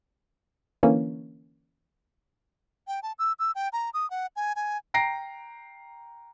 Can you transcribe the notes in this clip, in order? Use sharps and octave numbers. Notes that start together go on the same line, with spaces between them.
D3 E3 A#3 C#4
G5
A5
E6
E6
G5
A#5
D#6
F#5
G#5
G#5
G5 A#5 A#6 C7 D7